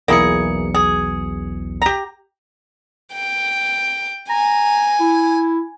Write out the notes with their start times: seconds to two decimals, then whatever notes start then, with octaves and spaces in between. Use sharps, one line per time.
0.08 B1 E2 A#3 E4 G#4 C#7
0.74 G#4
1.82 G4 A#5
3.13 G5
4.30 G#5 A#5
5.00 E4